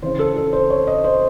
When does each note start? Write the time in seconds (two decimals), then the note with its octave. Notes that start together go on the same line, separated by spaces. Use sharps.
0.02 C#3 E3 C5
0.19 A4
0.37 A4
0.53 C5
0.70 C#5
0.87 D#5
1.04 C5